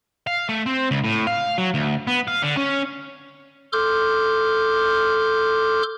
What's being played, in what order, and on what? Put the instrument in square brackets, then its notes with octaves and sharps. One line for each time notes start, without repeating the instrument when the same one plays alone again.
[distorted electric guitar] F5
A3
C4
C#2
A2
F5
F#3
D2
B3
F5
D3
C#4
[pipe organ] A4 C6 D6 F6 G6